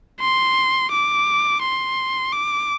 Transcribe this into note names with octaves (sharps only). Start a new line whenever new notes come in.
C6
D6
C6
D6